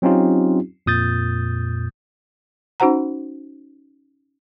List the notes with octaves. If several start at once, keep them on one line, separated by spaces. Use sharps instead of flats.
F#3 C4 C#4 D#4 F4 G4
F2 A#2 D#6 G6 A6
C#4 D#4 F#4 C5 F#5 A#5